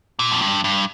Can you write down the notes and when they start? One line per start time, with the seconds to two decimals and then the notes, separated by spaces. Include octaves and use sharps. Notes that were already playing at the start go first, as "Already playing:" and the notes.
0.19 A#2
0.32 F2
0.41 G2
0.64 G2